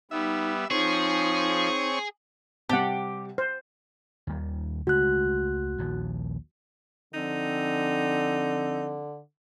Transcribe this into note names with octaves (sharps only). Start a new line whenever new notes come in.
G3 B3 D#4 E5
F3 C4 D#4 G#4 C#5 C#6
C3 G3 G4 F#5 A5
C5
D#2 D#3 G3
C#2 G#3 A3 F#4 F#6
A#1 D#2 F3
D3 F3 C4 D#4